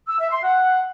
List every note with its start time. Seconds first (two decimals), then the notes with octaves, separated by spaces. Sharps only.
0.08 E6
0.20 E5
0.32 C6
0.44 F#5